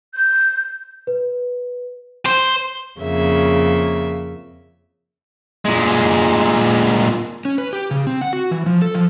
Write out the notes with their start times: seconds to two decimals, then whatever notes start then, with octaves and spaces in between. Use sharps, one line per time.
0.14 G6
1.07 B4
2.26 C5
3.00 F2 C#3 A#3 E5
5.65 A#2 G#3
7.45 C#4
7.58 B4
7.73 G4
7.91 C#3
8.07 C4
8.21 F#5
8.33 F#4
8.51 E3
8.66 F3
8.82 A4
8.95 F3